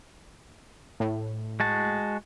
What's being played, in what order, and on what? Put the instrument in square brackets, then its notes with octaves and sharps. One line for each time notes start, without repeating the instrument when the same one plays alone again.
[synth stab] A2
[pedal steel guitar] G#3 F#4 A5